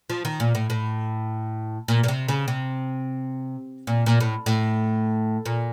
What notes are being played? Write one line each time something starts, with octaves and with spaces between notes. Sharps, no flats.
F3
D#3
A#2
A2
A2
A#2
A#2
C3
C#3
C3
A#2
A#2
A2
A2
A#2